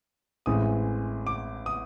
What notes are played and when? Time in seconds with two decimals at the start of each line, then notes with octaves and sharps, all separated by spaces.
0.46 A1 A2 E3 G#3 C4 D#6
1.27 D6
1.66 D#6